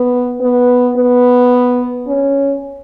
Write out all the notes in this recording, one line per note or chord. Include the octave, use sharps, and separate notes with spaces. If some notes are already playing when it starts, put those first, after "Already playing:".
Already playing: B3
B3
B3
C#4